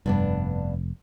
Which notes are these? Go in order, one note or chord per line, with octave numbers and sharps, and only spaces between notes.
F1 G2 B3 D4